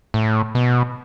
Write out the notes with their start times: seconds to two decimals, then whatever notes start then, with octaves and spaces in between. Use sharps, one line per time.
0.14 A2
0.55 B2